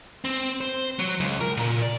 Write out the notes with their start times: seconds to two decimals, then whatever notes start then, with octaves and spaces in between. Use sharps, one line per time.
0.24 C4
0.61 C5
0.99 F#3
1.20 C#2
1.41 A#4
1.57 A#2
1.82 D5